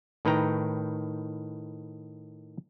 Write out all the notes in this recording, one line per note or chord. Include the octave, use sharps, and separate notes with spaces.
A2 D#3 B4 G5 A#5